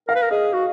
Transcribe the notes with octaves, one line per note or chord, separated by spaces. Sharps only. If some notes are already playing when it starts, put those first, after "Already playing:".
A#4 F5
B4
A#4
G#4 D#5
F#4